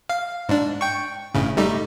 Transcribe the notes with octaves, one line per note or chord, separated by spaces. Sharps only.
F5
G#2 D4
G5 C#6
G1 A2 C#3
G3 A3 D#4